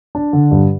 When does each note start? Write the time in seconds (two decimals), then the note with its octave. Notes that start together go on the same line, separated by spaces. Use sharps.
0.15 D4
0.33 D3
0.52 G2